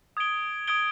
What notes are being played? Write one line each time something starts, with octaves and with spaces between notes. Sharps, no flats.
D#6 G#6 D7 G7
D#6 G#6 D7 G7